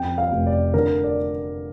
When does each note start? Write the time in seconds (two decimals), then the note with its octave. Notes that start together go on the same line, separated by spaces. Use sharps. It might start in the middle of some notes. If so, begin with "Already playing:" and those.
Already playing: F2 G5
0.18 F5
0.32 F1
0.46 D5
0.74 D3 A#4
1.04 D5